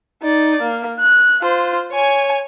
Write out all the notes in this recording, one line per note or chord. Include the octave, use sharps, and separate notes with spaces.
D#4 D5
A#3
F#6
F4 C5
C#5 G#5